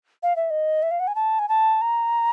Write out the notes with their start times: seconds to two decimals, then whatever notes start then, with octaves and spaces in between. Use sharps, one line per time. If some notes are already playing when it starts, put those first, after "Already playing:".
0.23 F5
0.36 E5
0.50 D#5
0.83 E5
0.91 F5
1.00 F#5
1.07 G#5
1.15 A5
1.39 G#5
1.49 A5
1.81 A#5